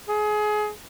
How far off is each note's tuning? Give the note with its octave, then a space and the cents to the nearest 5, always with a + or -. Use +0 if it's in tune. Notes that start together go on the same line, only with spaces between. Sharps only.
G#4 +25